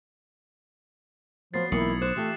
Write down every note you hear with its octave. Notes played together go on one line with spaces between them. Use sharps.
F3 F#3 B3 A6 C7
B1 E3 A#3 E4 F4 D#6 C#7 F#7
G#6
C5 D6 F#6 E7
E3 A3 F4 G4